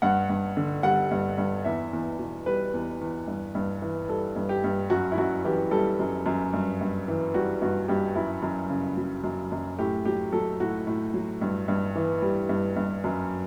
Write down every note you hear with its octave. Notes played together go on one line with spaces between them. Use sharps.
G2 F#5
G2
D3
G3 F#5
G2
G2
E2 E5
E2
B2
G3 B4
E2
E2
G2
G2
E3
G3 A4
G2
G4
G2
F#2 F#4
E4
F#2 F#4
E3 G4
G3 A4
F#2
F#2
G2
G2
E3
G3 F#4
G2 F#4
G2 G4
F#2 E4
F#2
C#3
F#3
F#2
F#2
A2 G4
F#3 G4
F#3 A4
A2 F#4
A2
F#3
G2
G2
E3
G3
G2
G2
F#2